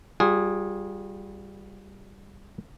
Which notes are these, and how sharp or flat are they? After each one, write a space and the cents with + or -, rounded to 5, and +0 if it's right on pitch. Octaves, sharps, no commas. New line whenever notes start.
G3 +0 F4 +35 G#4 -10